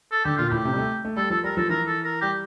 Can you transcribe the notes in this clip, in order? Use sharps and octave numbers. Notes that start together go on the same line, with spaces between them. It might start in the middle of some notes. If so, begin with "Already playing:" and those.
A4
D3 G4
A#2 F4
A2 G4
C3
G3
A3
A3
G3 A4
F3 A4
G3 A#4
F3 A4
E3 A#4
A4
A#4
G3 G4